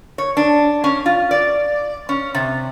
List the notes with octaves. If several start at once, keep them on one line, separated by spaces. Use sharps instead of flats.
C#5
D4
C#4
F4
D5
C#4
C3